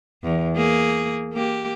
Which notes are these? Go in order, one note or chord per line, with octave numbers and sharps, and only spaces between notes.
E2
A#3 G#4
A#3 G4